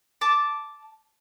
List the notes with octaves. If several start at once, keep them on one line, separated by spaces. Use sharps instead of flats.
A5 D6